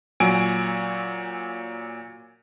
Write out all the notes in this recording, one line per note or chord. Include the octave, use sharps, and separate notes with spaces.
A#2 F#3 G#5 D7